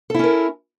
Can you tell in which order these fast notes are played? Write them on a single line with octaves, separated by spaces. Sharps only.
A4 E4 C#4 A#4